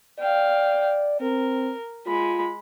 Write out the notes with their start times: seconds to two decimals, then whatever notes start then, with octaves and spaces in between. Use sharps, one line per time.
0.19 D5 F5 G5
1.21 C4 A#4
2.07 G#3 F4 B5